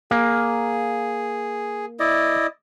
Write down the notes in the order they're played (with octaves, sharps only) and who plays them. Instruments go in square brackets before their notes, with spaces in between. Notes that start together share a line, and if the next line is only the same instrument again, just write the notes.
[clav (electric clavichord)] A#3 [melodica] G#4
[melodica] E4 D5 D#5